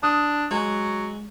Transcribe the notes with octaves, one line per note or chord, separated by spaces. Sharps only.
D4 D#6
F#3 G#3